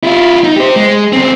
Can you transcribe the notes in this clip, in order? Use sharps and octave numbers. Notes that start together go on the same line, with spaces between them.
E4 F4
D#4
G4 C5
G#3
D2 C4